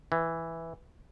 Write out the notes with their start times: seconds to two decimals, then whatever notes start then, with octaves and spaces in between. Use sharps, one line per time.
0.12 E3